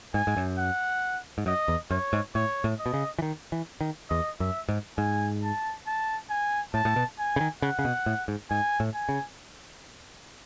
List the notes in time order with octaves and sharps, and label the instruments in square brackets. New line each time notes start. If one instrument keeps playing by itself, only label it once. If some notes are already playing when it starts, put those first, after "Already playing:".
[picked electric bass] G#2 [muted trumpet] G#5
[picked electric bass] G#2
F#2
[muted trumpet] F#5
[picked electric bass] G#2
[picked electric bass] F#2 [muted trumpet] D#5
[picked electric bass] E2
[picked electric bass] F#2 [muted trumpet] C#5
[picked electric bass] G#2
[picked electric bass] A2 [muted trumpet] C#5
[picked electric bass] A2
[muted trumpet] D#5
[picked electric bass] B2
C#3
E3
D#3
E3
D#3
[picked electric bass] E2 [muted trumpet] D#5
[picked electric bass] F#2 [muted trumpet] E5
[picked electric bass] G#2
[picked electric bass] G#2 [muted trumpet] G#5
[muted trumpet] A5
A5
G#5
[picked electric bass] A2 [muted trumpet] A5
[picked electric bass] A2
B2
[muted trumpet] G#5
[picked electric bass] C#3
D#3
[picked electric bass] C#3 [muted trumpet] F#5
[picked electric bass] C#3
B2
A2
G#2
[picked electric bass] G#2 [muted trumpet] G#5
[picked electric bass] A2
[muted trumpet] G#5
[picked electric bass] C#3